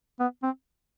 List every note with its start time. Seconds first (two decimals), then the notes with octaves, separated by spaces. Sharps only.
0.19 B3
0.43 C4